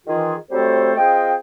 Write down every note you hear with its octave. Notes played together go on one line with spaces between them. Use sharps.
D#3 E3 F4 G#4
F#3 G3 A3 C4 A4 C5
C4 F4 G#4 D#5 G5